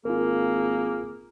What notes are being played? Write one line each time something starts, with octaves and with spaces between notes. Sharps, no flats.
G#1 A#3 F4 G#4 A#4